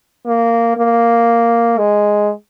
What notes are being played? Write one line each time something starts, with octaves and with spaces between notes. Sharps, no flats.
A#3
A#3
G#3